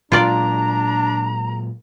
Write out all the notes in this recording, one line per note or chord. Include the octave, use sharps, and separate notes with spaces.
A#2 F#3 G#3 D4 F4 D5 A#5